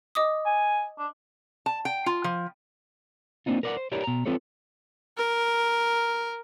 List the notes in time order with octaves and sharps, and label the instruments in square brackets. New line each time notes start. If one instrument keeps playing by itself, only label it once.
[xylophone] D#5 D6 D#6
[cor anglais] G#5
D4
[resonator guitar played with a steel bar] A5
G5
F4
F3
[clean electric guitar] A#3 C4 D4 D#4 F4
A#4 B4 D5 E5 F#5
C5
E4 G4 A#4 B4 C#5 D5
B2 A#5
C4 F4 A4 B4 C#5
[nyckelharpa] A#4